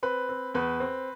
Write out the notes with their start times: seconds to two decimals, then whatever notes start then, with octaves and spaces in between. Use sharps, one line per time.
0.03 C4 B4
0.29 C4
0.54 E2 B4
0.80 C4